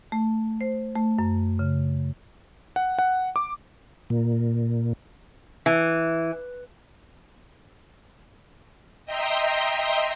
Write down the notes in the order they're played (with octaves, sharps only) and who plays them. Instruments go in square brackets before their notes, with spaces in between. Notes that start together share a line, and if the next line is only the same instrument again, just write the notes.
[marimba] A3
C5
A3
F#2
C#3
[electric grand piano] F#5
F#5
D6
[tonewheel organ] A#2
[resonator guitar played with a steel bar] E3
[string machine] D#5 E5 G5 A#5 C6